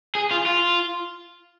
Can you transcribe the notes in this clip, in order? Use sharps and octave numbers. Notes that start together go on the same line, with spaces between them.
G#4
F4
F4